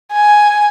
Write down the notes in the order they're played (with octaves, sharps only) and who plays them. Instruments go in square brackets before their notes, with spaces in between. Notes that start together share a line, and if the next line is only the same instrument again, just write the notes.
[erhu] G#5